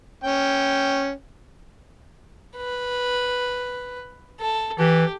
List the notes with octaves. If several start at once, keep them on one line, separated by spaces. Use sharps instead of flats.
C#4 G5
B4
A4
E3 G4